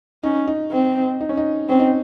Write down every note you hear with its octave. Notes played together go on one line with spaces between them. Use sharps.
C#4 D#4
D#4
C4
D#4
C#4
D#4
C4 C#4
D#4